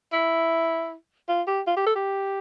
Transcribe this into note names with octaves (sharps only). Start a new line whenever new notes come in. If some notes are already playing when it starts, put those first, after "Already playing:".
E4
F4
G4
F4
G4
A4
G4